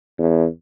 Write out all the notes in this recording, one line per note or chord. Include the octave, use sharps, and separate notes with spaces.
E2